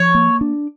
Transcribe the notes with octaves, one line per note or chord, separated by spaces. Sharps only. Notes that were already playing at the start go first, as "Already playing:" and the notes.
Already playing: F3 C#5
A#3
D4